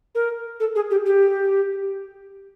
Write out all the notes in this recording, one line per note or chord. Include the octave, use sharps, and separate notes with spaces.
A#4
A4
G#4
G4
G4